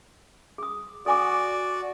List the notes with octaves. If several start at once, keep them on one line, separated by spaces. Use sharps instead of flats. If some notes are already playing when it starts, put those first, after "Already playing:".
G#4 D#6
F#4 A4 D5 G#5 D6